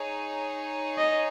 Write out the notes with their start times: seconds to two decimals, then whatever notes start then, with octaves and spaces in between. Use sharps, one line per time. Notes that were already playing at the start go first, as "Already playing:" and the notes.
Already playing: D#4 G#4 C#5
0.98 D#5